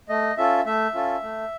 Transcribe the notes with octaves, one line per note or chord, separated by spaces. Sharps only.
A3 D#5
C#4 F4 A4 E5
A3 E5
C#4 F4 A4
A3